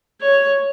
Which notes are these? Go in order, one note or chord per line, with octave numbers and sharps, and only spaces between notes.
C#5